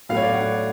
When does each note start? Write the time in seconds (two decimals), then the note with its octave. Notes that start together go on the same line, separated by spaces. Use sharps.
0.09 A2 F#3 A3 F5
0.17 C#5
0.22 D5
0.34 F#5